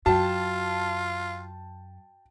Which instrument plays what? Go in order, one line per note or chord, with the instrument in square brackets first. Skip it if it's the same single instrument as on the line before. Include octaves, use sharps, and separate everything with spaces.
[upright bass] F#2 [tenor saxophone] F4 [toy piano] F#4 [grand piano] G5 A5